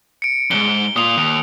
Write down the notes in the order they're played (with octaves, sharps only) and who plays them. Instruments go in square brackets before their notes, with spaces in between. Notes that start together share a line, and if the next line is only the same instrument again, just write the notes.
[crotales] C#7 D7
[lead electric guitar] E2 G#2 [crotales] D7 G7
[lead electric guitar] A#2 F4 [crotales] D#6 F7
[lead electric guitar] D#2